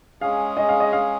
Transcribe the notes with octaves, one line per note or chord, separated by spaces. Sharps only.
G#3 C#4 G#4 F5
D#5
F5
D#5
F5